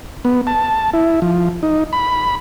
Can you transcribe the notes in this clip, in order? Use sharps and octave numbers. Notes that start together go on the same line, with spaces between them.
B3
A5
E4
F3
D#4
B5